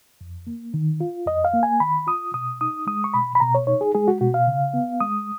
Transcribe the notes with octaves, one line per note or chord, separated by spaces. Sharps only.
F2
A#3
D#3
F4
F2 D#5
F5
A#3
G#5
D#3 B5
F4 D#6
B2 D#6
D#4 D#6
G#3 D#6
C#6
B2 B5
B5
B2 A#5
C#5
D#4 C#5
G#4
G#3 G#4
F#4
B2 F#4
F5
C#3
B3
G#3 D#6